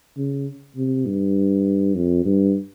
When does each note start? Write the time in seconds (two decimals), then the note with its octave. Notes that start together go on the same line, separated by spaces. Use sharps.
0.17 C#3
0.76 C3
1.06 G2
1.95 F2
2.25 G2